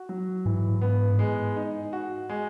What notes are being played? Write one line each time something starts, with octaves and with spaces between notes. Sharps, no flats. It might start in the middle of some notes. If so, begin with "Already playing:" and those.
Already playing: F#4
F#3
G#2 E3
B3
G#3
D#4
F#4
G#3